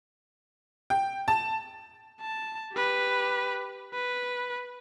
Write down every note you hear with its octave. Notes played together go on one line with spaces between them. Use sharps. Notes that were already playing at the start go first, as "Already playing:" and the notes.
G5
A5
A5
G4 B4
B4